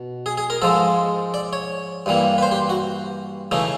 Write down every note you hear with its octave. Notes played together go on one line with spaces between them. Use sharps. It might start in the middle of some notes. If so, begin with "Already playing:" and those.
Already playing: B2
G#4
G#4
A#4
G#2 F3 G#3 A4
D5
C#5
G2 E3 G3 A#3
B4
C5
G4
F#4
C#3 E3 A3 D#4